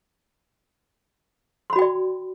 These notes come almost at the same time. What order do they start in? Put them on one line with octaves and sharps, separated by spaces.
C6 B5 F#4 G5 D5